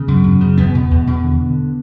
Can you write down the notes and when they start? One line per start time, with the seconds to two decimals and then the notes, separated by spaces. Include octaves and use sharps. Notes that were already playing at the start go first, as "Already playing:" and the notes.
Already playing: C#3 B3
0.08 F#2
0.24 F#2
0.41 C#3
0.57 E2 B3
0.75 B2
0.91 E2
1.07 B2
1.24 D3
1.41 D3